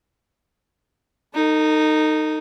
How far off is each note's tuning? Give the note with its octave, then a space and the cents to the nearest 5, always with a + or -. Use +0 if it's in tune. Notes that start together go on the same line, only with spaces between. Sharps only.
D#4 -10 A4 +45